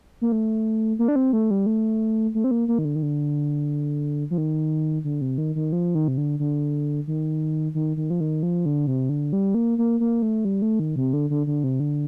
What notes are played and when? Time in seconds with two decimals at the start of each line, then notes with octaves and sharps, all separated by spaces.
0.21 A#3
0.32 A3
0.99 A#3
1.08 D4
1.16 C4
1.33 A3
1.51 G3
1.66 A3
2.35 A3
2.44 C4
2.51 A#3
2.68 A#3
2.78 D#3
2.85 D3
2.96 D#3
3.03 D3
4.31 F3
4.38 D#3
5.04 D3
5.21 C3
5.38 D#3
5.55 D#3
5.72 F3
5.95 D#3
6.08 C3
6.18 D3
6.39 D3
7.07 D#3
7.74 D#3
7.97 D#3
8.10 F3
8.20 D#3
8.43 F3
8.66 D3
8.87 C3
9.09 D3
9.33 G3
9.54 A#3
9.78 A#3
10.00 A#3
10.22 A3
10.45 G3
10.62 A3
10.79 D#3
10.96 C3
11.13 D3
11.30 D3
11.47 D3
11.64 C3
11.80 D3